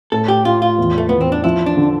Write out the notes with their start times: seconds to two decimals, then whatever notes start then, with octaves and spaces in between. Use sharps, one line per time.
0.12 A2 A4
0.28 G4
0.45 A2 F4
0.62 F4
0.78 E2
0.98 A3
1.09 E2 B3
1.21 C4
1.32 D4
1.44 F3 E4
1.66 D4
1.77 D3